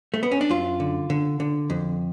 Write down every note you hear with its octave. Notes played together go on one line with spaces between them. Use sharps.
A3
B3
C#4
D4
F#2 F4
D3
D3
D3
F2